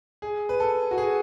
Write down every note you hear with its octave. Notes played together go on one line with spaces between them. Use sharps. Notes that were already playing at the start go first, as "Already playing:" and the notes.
G#4
B4
A4
F#4
G#4